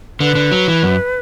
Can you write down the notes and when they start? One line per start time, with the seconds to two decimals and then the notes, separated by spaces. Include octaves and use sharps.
0.20 D3 B4
0.35 D3
0.52 F#3
0.68 E3
0.83 F#2